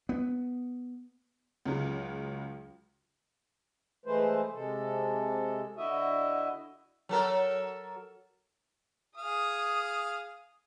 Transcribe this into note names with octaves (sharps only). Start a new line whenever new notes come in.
B3
C#2 C#3 F#3
E3 G#3 A3 B4 C5
C3 G#3 A4
D3 E4 F#4 D#5 E5
F#3 A4 A#4
G#4 F5 D#6